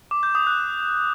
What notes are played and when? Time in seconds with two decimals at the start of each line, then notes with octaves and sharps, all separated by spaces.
0.11 D6
0.23 G6
0.35 D#6
0.47 F#6